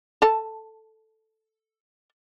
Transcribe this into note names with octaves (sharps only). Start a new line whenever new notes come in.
A4 A5